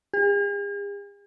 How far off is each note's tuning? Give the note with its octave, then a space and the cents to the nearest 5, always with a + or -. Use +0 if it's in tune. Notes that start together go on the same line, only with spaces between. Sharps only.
G#4 -45